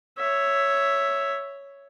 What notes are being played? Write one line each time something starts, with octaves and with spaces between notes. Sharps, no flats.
C#5 E5